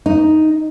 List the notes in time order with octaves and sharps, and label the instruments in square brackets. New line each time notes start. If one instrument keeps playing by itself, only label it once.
[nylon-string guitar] D#4